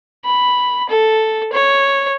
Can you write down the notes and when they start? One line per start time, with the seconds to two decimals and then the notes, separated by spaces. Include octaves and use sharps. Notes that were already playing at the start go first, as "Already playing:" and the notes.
0.25 B5
0.89 A4
1.53 C#5